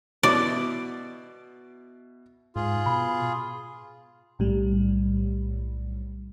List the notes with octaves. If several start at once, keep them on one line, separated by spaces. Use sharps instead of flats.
B2 E4 D5
G#2 F4 G#4
B2 B5
B1 A2 G3